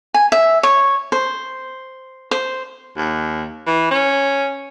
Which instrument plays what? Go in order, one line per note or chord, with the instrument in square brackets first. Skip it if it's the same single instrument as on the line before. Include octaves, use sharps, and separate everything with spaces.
[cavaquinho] G#5
E5
C#5
C5
C5
[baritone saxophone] D#2
E3
C#4